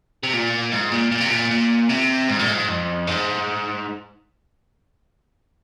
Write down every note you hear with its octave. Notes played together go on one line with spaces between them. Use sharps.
C3
A#2
G#2
A#2
A#2
C3
A#2
A#2
C3
G#2
A#2
G#2
F2
G#2